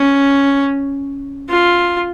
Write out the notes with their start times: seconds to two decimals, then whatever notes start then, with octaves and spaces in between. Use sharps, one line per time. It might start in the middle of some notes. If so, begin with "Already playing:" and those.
Already playing: C#4
1.50 F4